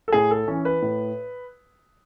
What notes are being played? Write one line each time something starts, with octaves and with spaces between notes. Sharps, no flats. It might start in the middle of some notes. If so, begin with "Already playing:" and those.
A4
A2 G#4
A4
E3 C#4
B4
A2